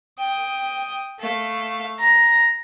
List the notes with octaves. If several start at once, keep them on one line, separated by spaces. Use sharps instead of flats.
G5 D#6
A3 F5
A#5